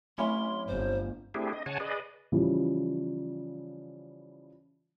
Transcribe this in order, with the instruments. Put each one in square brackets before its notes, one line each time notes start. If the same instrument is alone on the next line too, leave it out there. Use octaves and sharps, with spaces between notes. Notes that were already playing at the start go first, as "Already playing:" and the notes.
[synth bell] F#3 A3 C4 [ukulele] C#4 E4 C#5 [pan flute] C6
[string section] G1 [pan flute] C5
[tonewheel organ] A3 C4 D4 E4 G4 G#4
D#5
C#3 C#5 F#5 G#5 A5
G#4 B4 D5 D#5
[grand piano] C#3 E3 F3 G3